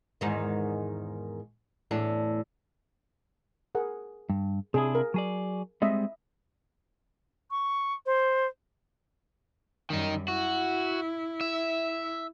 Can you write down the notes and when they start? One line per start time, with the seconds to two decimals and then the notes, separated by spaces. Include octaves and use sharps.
0.21 E2 G#2 D#3
1.91 E2 A2 D4
3.75 G#4 A#4 F#5
4.30 G2
4.74 C3 D4 E4 G#4
4.95 A#4
5.14 F#3 G#4 D5
5.82 G3 G#3 C4 D#5 E5
7.51 C#6
8.06 C5
9.90 F#2 D#3 G3 D#4
10.28 E4 F#4
11.41 E5